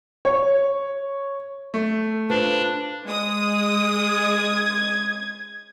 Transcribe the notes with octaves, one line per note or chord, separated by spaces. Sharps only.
C#5
A3
D4 F4 B4 C5
G#3 D#6
G#6